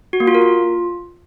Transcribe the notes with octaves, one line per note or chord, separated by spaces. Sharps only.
F#4
A#3
F4
A#4
F4